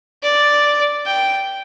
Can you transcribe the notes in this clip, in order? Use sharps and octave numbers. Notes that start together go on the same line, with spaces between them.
D5
G5